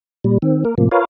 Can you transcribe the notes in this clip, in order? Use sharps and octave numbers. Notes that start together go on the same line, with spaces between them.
A#2 G3
D#3 C4
A#3 A#4
A2 C3 F3 A#3
F4 A#4 B4 C#5 F5